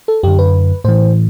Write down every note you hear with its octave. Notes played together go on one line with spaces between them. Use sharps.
A4
F#2 D3 G4
B4
A2 E3 C5